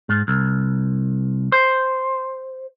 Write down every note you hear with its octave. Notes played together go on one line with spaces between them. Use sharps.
G#2
C2
C5